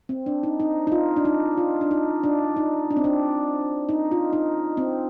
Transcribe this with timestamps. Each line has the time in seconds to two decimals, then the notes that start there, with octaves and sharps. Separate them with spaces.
0.09 C4
0.26 D4
0.43 D#4
0.60 D#4
0.87 D#4
0.92 F4
1.16 D4
1.25 D#4
1.58 F4
1.81 D4
1.91 D#4
2.23 D4
2.56 D#4
2.91 D4
2.96 C4
3.04 D4
3.89 D#4
4.12 F4
4.33 D#4
4.77 C4